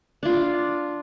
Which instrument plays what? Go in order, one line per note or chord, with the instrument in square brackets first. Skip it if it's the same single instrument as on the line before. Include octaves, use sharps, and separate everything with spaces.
[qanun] D4 F4